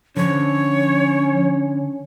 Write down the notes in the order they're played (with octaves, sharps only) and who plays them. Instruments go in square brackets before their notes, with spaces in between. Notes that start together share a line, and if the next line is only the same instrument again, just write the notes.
[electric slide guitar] D3 [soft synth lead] F3 [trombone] C#4 [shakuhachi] C#5